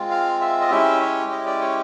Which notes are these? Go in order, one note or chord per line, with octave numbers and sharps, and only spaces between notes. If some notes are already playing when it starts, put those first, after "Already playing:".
Already playing: G#3 C4 F4
F5
E5
D#5
G#3 C#4 E4 G4 E5
C#5
D#5
D5
C#5